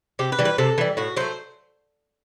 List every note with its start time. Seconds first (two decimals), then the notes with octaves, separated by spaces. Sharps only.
0.19 C3 G4
0.32 B4
0.39 E3 G3
0.45 B4
0.58 C3 A4
0.78 E3 G3
0.97 A2 F#4
1.17 F#3 A3 C5